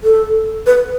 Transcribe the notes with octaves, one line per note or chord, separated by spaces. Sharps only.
A4
B4